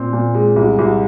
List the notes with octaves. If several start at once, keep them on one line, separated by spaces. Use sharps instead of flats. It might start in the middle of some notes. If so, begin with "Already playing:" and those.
Already playing: A#2 C4
A#2
G#3
C2
C2